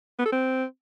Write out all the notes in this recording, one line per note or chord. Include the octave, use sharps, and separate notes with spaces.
B3
A4
C4